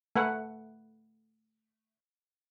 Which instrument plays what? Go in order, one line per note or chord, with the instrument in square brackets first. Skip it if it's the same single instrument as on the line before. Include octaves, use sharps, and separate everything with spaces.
[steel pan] A3 B4 F#5